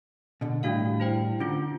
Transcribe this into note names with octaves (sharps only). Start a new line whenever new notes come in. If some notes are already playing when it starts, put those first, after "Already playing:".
B2 D3
A2 D#3 G3 D4 F#4 F5
E4 C5 G5
D3 C#4 F4